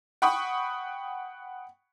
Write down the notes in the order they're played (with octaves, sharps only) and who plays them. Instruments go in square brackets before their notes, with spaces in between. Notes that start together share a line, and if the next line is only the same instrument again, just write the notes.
[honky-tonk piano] F#5 G5 B5 C#6 D#6